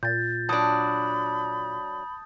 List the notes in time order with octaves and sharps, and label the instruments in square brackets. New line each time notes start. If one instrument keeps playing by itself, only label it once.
[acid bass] A#2 [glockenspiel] G6 A6
[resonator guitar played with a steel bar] F#3 D4 [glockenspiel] A5 D#6 [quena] B5